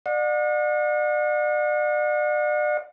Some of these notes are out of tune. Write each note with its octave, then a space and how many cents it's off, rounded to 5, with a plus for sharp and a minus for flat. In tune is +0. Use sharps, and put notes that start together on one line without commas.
D5 +35 F#5 -40